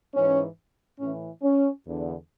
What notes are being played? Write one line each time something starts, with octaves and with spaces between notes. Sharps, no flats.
G#2 E3 C#4
A2 E3 C#4
C#4
E2 D3